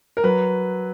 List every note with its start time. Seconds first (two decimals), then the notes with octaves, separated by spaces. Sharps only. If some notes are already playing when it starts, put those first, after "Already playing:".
0.17 A#4
0.24 F#3 B4